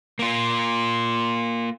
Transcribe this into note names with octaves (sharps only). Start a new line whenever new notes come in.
A#3 F4